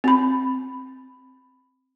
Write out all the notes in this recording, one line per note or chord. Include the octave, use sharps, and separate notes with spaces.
C4 B5